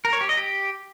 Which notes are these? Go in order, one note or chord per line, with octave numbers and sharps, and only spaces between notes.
A#4
C#5
G4
D#5
G4